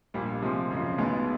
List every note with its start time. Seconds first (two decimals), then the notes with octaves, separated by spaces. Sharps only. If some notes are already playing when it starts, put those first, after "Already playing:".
0.14 A#1 A#2 G3
0.42 C3 F3 G#3
0.70 F#2 C#3 F3
0.98 B1 B2 G#3 B3